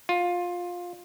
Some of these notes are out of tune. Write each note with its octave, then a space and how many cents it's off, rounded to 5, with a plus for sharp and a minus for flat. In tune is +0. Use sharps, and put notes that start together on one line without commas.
F4 +15